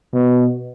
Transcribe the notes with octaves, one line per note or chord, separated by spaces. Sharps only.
B2